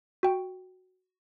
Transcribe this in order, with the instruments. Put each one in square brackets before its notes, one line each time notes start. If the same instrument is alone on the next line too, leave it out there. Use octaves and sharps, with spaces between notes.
[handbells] F#4 G5